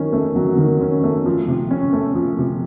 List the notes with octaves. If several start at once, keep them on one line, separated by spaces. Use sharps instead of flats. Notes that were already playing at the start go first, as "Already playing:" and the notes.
Already playing: D#3 F#3 C#4
A3
F#3
D#3
C#4
A3
F3
C3
C#4
A3
F3
C3